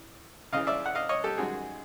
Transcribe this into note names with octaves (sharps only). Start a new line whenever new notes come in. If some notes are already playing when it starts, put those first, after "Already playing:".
Already playing: A1 A2
C#2 C#3 E3 D#5 F5
D5 E5
F#5
D#5 F5
C#5 D#5
G4 A4
F#2 D#3 G#3 F#4 G#4